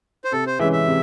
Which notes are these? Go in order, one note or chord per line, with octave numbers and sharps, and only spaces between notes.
C5
C3 A4
C5
E3 G#3 C#4 E5
E5
C3